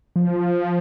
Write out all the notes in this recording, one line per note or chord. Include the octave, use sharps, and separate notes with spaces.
F3